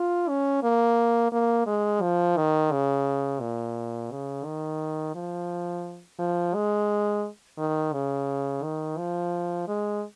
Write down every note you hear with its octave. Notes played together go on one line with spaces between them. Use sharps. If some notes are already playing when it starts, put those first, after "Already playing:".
Already playing: F4
C#4
A#3
A#3
G#3
F3
D#3
C#3
A#2
C#3
D#3
F3
F3
G#3
D#3
C#3
D#3
F3
G#3